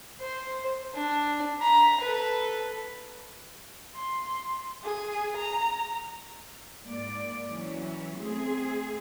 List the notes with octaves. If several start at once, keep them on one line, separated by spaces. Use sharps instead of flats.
C5
D4
A#5 B5
A4 B4
C6
G#4
A#5
G#2 A#3 D5
E3 F#3 C#4
A3 C4 G#4